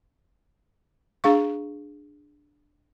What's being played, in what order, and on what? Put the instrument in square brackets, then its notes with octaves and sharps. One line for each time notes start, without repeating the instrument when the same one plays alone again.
[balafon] D4 G#4 F5 C#6